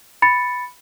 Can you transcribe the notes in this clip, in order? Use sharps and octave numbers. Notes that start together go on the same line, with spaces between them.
B5 A6 C#7